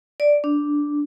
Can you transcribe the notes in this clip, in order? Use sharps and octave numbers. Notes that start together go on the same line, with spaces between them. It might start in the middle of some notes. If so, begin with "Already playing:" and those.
D5
D4